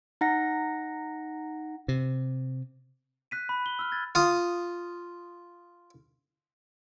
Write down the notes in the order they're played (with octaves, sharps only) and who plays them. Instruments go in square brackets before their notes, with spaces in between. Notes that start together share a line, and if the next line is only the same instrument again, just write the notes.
[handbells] D#4 F#5 A#6
[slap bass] C3
[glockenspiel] F#6 B6 D#7
B5
G7
E6 F6
F#6 G#6 A6
[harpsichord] F4 D#6